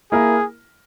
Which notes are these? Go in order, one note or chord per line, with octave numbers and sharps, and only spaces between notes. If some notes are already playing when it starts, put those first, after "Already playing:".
A#3 E4 G#4 A#4